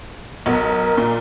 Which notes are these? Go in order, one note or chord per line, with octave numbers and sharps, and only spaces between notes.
B1 B3 A#4
A#2